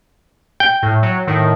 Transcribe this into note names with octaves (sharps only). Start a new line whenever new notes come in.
G5
A2
F#3
A2 D#3